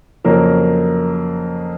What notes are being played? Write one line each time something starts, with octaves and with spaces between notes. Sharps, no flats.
F2 C#3 F#3 A#3 A#4